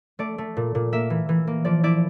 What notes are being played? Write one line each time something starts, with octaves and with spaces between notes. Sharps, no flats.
A3 D5
A3
A#2
A#2
A#3 E5
E3
E3
A#3
F3 D5
E4 D5